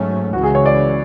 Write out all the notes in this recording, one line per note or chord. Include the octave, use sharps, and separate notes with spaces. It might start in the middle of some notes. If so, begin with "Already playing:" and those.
Already playing: G#2 F#3 A3 C#4
C#2 C#3 E3 F#4
G#4
C#5
D5